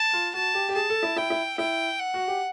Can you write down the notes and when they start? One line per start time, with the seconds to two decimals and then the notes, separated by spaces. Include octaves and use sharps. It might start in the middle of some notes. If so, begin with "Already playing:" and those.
Already playing: A5
0.13 F4
0.34 F#4 A5
0.54 G4
0.69 G4
0.75 G#4 A5
0.90 A4
1.03 E4
1.16 E4 G5
1.30 E4
1.58 E4 G5
2.00 F#5
2.14 F#4
2.28 G4